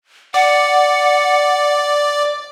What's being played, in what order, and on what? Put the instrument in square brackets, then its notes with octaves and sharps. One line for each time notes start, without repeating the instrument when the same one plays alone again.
[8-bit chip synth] D5 [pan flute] F#5